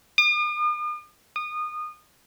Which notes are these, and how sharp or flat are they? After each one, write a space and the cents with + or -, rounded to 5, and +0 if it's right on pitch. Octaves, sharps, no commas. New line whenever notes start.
D#6 -45
D#6 -25